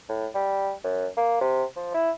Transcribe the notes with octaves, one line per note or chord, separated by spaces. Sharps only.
A2
G3
F#2
A#3
C3
F3
E4